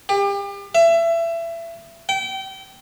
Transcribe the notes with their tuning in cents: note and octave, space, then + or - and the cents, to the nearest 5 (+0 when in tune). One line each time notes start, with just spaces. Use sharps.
G4 +35
E5 +25
G5 -30